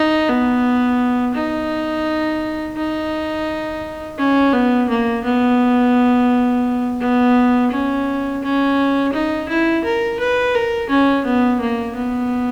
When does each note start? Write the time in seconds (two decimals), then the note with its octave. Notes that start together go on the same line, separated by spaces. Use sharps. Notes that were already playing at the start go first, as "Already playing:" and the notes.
Already playing: D#4
0.29 B3
1.35 D#4
2.76 D#4
4.18 C#4
4.53 B3
4.89 A#3
5.24 B3
7.01 B3
7.71 C#4
8.43 C#4
9.13 D#4
9.49 E4
9.84 A#4
10.20 B4
10.54 A#4
10.90 C#4
11.25 B3
11.61 A#3
11.96 B3